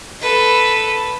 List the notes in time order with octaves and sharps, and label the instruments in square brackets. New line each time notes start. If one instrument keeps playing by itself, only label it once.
[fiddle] A4 B4